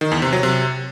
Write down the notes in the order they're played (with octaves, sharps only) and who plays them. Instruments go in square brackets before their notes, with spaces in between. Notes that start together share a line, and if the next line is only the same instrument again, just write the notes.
[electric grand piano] D#3
E2
C3
F#3
C3